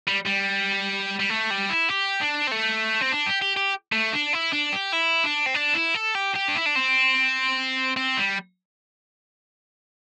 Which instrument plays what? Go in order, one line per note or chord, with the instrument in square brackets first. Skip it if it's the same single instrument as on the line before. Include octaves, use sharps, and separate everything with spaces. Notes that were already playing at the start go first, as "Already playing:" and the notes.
[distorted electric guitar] G3
G3
G3
A3
G3
E4
G4
D4
C4
A3
C4
D4
G4
G4
G4
A3
D4
E4
D4
G4
E4
D4
C4
D4
E4
A4
G4
G4
D4
E4
D4
C4
C4
G3